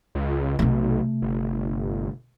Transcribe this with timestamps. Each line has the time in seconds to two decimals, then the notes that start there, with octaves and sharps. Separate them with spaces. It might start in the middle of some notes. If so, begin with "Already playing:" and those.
0.15 C#2
0.59 B1 C3 A3
1.22 G1